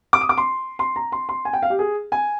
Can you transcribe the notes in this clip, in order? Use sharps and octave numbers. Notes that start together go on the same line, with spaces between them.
D6
D#6
D6
C6
C6
A#5
C6
C6
G#5
G5
F5
G4
G#4
G#5